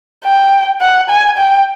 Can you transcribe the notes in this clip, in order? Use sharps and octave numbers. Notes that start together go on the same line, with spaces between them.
G5
F#5
G#5
G5